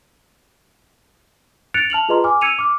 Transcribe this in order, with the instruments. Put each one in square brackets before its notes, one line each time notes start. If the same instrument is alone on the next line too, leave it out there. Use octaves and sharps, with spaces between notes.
[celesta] F#6 A6 C#7 D7 F7
A5 F6 F7 F#7
F4 G#4 B4 D#5 A#5 C6
G#5 D6 F6
E6 G#6 C#7 D#7 F7
D6 F6